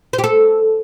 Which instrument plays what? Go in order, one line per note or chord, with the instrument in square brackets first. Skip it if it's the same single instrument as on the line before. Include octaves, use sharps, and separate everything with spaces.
[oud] C5
G4
A4